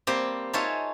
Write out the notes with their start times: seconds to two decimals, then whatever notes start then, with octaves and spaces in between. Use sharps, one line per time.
0.07 G3 A#3 C4 G4
0.53 D#4 F4 G#4 C#5 E5 A5